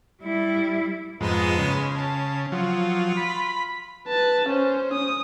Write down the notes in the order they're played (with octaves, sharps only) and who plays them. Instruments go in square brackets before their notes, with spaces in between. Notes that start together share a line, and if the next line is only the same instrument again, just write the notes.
[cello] G3 E4
[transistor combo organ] F2 G#2 [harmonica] G#3 B3 D#4
[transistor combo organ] C#3
[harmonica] A5
[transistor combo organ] F3 F#3 [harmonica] F4
[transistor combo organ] B5
[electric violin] B4 A5
C#4 C5
D#6